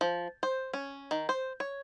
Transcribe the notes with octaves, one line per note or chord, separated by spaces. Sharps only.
F3
C5
C#4
D#3
C5
C#5